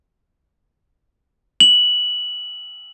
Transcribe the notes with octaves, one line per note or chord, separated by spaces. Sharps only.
F#7